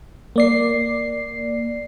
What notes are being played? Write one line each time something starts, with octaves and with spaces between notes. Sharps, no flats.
A#3 D5 C7